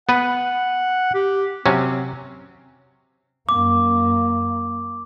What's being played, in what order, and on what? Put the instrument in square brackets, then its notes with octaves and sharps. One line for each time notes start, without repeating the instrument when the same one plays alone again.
[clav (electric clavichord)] B3 B4 [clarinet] F#5
[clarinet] G4
[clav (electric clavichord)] C3 F#3 C#4 [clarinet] C4
[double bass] F#2 A#3 [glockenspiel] D6